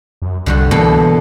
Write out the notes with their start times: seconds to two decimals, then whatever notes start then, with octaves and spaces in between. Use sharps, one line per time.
0.22 F#2
0.46 C2 D3 G3 F#4
0.71 B2 E3 A#3 A4